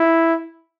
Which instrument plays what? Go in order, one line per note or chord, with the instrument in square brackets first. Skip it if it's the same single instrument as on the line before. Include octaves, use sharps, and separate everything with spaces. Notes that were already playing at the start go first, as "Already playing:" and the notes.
Already playing: [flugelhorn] E4